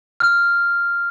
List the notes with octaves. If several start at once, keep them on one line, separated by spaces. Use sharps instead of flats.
F6